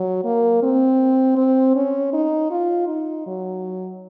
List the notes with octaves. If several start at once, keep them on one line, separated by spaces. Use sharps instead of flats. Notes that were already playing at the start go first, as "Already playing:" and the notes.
Already playing: F#3
A#3
C4
C4
C#4
D#4
F4
D#4
F#3